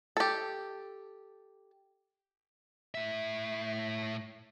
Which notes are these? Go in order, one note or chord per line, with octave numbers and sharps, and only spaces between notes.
G4 A4
A2 E5